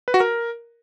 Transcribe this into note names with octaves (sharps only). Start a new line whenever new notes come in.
B4
F#4
A#4